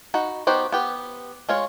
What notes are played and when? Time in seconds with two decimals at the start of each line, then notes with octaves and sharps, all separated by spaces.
0.14 D#4 F#4 B5
0.47 B3 D#4 F#4 G4 C5
0.72 B3 G4 B4
1.49 G#3 F4 C#5